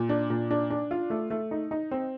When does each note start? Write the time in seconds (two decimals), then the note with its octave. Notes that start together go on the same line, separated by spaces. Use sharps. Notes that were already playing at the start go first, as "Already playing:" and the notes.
Already playing: A#2
0.09 D4
0.30 A#2
0.51 D4
0.70 D4
0.91 F4
1.10 A3
1.30 A3
1.51 D#4
1.71 D#4
1.91 C4